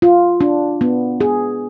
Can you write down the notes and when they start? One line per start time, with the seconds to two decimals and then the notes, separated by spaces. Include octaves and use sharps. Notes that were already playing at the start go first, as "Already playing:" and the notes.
0.02 F4
0.41 D4
0.81 B3
1.21 G#4